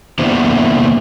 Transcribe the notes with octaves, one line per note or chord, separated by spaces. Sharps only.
A#3 B3 D4 E4 C5